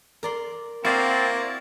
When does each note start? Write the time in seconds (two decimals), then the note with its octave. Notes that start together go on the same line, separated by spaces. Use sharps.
0.23 A#4 D5 C6
0.85 A#3 C4 E4 F#4 D5 F5